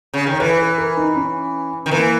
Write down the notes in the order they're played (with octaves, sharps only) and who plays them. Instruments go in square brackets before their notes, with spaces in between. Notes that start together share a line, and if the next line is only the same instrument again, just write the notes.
[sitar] C#3
[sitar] D#3 [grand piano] C#5
[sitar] E3 [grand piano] B4
[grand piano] B4
A#4
D#4
C#4
[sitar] D#3
[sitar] E3 [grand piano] A#3